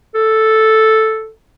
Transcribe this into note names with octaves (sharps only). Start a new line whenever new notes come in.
A4